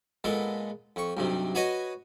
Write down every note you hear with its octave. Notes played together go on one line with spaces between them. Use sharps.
A#2 G#3 B3 A4
F2 C#6
B1 G2 C3
F#4 B4 C#5 D#5 G#5